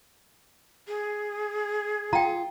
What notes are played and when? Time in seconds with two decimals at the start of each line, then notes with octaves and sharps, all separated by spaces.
0.88 G#4
2.13 F4 G5 A#5